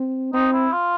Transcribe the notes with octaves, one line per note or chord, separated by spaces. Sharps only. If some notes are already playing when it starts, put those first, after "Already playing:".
Already playing: C4
C4 D#4
E4
F4